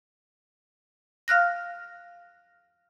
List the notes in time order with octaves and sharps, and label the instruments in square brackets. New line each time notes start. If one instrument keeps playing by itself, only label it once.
[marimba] F5 F6 F#6 A#6